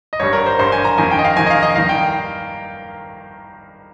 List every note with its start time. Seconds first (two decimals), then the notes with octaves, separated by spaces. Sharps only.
0.13 D#5
0.20 G#1 G2 G3 C#5
0.33 A#4
0.46 C5
0.58 G#1 G2 G3 C5
0.72 G#5
0.84 A#5
0.98 F2 D#3 A#3 G#5
1.11 G5
1.19 D#5
1.25 F5
1.36 F2 D#3 A#3 G#5
1.46 D#5
1.50 F5
1.63 D#5
1.76 G2 D#3 A#3 F5
1.89 G5